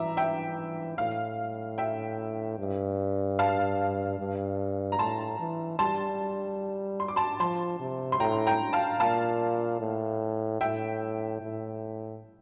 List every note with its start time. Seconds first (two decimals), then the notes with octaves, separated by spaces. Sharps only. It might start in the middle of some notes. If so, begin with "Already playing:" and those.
Already playing: E3 E5 A#5 D6
0.17 E5 G5
0.98 A2 F5
1.78 E5 G5
2.58 G2
3.39 F5 A5
4.19 G2
4.92 A#5
4.99 A2 A5 C6
5.39 E3
5.79 G3 A5 C6
7.00 C6
7.08 D6
7.16 A5 C6
7.40 F3 A5 C6
7.80 C3
8.12 C6
8.20 A2 G5 A#5
8.47 G5 A#5
8.73 F5 A5
9.00 A#2 F5 A5
9.80 A2
10.61 A2 E5 G5
11.41 A2